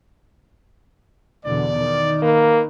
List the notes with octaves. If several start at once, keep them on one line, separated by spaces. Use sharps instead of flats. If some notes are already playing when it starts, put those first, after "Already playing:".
E2 B2 D3 D5
D#3
A#3 B4 F5 A#5